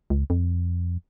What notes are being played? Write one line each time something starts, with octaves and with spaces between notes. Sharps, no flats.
C#2
F2